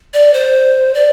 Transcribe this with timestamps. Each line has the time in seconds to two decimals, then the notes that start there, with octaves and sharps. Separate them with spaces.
0.13 D5
0.34 C5
0.94 D5